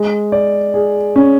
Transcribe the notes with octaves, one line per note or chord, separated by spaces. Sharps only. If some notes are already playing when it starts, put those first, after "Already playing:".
Already playing: G#3
D5
G#4
C#4